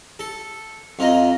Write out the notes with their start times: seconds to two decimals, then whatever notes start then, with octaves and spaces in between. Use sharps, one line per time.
0.19 A4
0.99 F2 F4 D#5 A#5